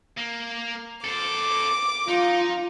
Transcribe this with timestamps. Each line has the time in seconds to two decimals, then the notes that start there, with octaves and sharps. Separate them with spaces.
0.17 A#3
1.04 A4 C5 D6
2.08 D#4 F4